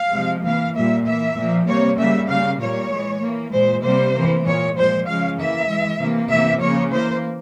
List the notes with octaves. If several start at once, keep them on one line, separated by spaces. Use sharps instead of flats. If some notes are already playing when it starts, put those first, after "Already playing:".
Already playing: F5
C3 F3 G#3
E3 A#3 F5
A#2 G3 A#3 E5
E3 A#3 E5
A#2 F3 A#3
C3 G3 A#3 C#5
C#3 G3 A#3 E5
C#3 G3 A#3 F5
A#2 G3 A#3 C#5
E3 G#3
E3 A#3
A#2 G#3 C5
C3 G3 A#3 C5
E3 A#3
A#2 G#3 C#5
A#2 F3 G#3 C5
C#3 F3 G#3 F5
E3 A#3 E5
E3 G#3
C3 E3 A#3
C3 E3 A#3 E5
C#3 F3 A#3 C#5
E3 A#3 C5